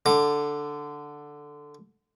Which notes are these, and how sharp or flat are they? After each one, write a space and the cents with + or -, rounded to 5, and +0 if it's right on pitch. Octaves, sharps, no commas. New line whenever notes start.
D3 +0 D6 +25